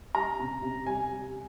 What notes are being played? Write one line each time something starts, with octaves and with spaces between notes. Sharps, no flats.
G3 A#5
C3
C3
G3 G#5
G3